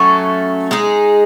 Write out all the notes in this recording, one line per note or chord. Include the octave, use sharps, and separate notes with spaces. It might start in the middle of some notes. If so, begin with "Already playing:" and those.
Already playing: F#3 A3 C#4
G#3 D#4 G#4